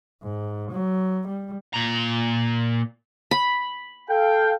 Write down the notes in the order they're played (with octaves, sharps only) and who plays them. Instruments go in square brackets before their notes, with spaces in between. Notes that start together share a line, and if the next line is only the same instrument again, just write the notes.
[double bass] G#2
F#3
G3
[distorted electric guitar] A#2 A#5
[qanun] B5
[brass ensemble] A4 F5 G5